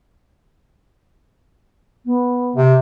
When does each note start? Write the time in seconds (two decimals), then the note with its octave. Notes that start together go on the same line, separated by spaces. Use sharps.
2.05 B3
2.56 C3